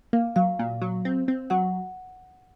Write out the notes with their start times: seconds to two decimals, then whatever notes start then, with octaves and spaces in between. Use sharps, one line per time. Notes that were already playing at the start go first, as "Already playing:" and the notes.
0.13 A#3 F5
0.36 F#3 F5
0.59 A#2
0.82 F#3
1.05 C4
1.28 C4
1.50 F#3 F#5